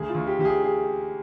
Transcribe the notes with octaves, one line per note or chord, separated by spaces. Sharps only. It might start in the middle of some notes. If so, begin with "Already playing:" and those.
Already playing: D2 G#4
F4
D2
G4
D2 G4
G#4
G#4